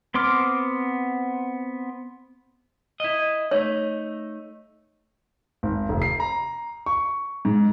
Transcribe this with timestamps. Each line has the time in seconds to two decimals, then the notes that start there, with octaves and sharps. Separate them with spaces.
0.14 B3 C4 C6 D6 F6
3.00 E4 D#5
3.51 A3 D#4 C#5
5.63 G#1
5.89 F1
6.02 C7
6.20 A#5
6.86 C#6
7.45 G#2